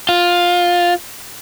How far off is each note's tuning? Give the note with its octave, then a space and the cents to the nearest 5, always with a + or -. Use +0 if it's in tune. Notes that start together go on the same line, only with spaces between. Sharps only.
F4 +10